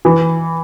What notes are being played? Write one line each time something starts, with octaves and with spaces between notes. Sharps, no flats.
E3